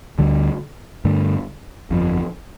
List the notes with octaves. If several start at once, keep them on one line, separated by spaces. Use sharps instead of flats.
D2 D3 G3
G2 D3 A3
G1 F2 D3 F3